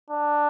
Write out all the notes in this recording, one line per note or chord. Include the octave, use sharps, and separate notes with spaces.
D4